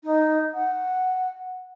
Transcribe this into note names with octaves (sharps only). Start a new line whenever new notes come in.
D#4
F#5